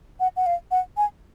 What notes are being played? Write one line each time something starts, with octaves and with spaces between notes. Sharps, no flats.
F#5
F#5
F5
F#5
G#5